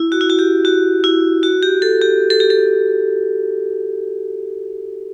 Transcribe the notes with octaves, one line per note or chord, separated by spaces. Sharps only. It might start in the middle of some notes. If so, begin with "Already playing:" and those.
Already playing: E4
F#4
E4
F#4
G4
F#4
E4
F#4
G4
A4
G4
A4
G4
A4